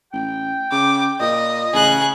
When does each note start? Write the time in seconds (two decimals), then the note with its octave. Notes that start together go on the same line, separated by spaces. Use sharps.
0.13 A1 G5
0.72 C#3 D6
1.20 A#2 D#5
1.73 A1 C#3 G#4 F#6